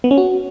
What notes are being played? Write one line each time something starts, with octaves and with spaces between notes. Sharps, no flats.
B3
C#4
F#4